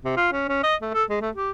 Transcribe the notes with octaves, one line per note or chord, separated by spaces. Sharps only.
C3
F4
C#4
C#4
D#5
A3
A4
G#3
A3
G4